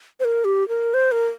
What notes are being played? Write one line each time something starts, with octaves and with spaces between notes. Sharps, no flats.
C5
A#4
G4
A#4
C5
A#4